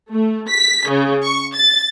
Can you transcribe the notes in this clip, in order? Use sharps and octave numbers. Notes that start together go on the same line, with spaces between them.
A3
B6
C#3
C#6
A6